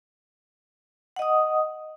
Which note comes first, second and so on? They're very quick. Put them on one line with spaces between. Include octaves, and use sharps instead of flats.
F#5 D#5 D#6